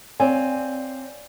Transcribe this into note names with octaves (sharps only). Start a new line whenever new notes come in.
C4 C#5 D5 F5 G#5